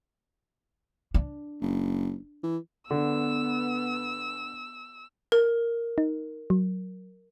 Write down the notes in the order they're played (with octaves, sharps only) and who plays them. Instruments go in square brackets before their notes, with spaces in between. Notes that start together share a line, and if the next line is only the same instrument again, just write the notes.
[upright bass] D4
[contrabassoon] F#1
E3
[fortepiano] D3 [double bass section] B3 [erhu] E6
[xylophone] A#4
[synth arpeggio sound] D#4
F#3